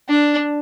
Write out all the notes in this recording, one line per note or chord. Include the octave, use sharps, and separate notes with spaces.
D4